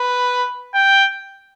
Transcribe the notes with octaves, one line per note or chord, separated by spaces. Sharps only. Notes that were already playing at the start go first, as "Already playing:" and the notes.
Already playing: B4
G5